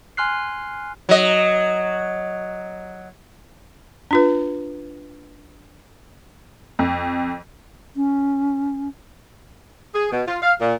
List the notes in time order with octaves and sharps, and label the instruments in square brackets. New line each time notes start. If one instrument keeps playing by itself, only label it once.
[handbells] G#5 C6 F6 F#6 C7
[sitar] F#3 D#5
[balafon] D4 F4 B4
[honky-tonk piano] F2
[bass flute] C#4
[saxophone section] G#4
B2
F4
F5
A#2